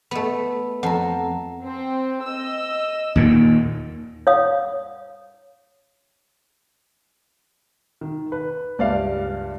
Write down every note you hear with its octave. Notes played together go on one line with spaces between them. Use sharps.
A3 B3 B5
F2 F#5 A5 A#5
C4
D#5 E6
D#2 A#2 D#3
C#5 F5 D#6
D#3
B4
C#2 G2 D5 E5 F5